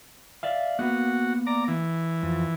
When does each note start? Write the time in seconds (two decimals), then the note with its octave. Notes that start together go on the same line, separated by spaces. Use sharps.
0.43 D5 E5 F5
0.79 A#3 B3 F#4
1.47 D5 A#5
1.68 E3
2.23 F2